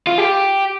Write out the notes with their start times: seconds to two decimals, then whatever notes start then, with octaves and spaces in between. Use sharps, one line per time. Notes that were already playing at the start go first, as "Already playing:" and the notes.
0.07 F4
0.18 G4